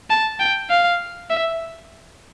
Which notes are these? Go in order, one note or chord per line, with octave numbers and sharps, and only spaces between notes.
A5
G5
F5
E5